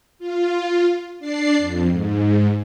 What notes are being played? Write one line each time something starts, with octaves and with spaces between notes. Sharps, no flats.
F4
D4 D5 C7
F2
G#2